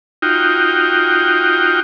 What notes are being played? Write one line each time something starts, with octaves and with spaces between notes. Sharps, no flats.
D#4 F4 F#4 G5